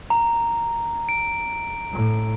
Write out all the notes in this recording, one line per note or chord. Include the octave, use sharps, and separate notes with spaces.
A#5
D7
A2